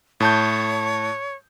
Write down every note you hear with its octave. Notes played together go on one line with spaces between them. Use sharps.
A2 C#5 A5 G6